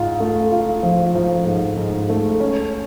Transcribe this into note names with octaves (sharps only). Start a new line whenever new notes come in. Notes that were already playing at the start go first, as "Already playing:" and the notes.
Already playing: G#2 F4
A3
F4
F3
F3
G#2
G#2
A3
C#4